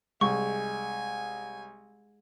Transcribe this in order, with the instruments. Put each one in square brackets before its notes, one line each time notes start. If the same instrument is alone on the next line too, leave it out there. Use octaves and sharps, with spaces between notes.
[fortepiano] C2 [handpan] G#3 [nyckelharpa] G#5 [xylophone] C#6